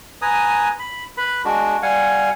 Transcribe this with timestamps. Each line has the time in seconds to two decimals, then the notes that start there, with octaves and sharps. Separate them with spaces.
0.22 B4 G#5 A#5 D#6
0.79 B5
1.17 B4 B5
1.45 G#3 D4 F#4
1.83 G3 F5 F#5 G#5